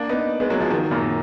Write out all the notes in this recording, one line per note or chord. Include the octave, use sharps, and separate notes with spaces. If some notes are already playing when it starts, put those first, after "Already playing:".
Already playing: A#3 D4
B3 D#4
G#3 B3
F#3 A#3
F3 G#3
D#3 F#3
F#2 A#2